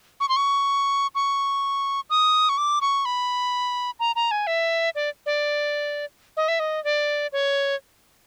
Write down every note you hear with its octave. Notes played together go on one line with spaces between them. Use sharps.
C#6
C6
C#6
C#6
D#6
C#6
D6
C#6
B5
A#5
A#5
G#5
E5
D5
D5
D#5
E5
D#5
D5
C#5